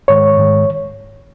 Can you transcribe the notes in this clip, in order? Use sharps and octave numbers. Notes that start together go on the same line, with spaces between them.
G#2 D#3 G#3 C#5
G#2 D#3 G#3